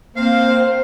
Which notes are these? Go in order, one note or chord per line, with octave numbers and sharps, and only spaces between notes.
A#3 C4 C5 F5